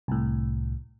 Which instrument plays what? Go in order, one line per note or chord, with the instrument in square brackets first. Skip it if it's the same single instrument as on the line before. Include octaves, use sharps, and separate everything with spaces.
[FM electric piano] C2 A2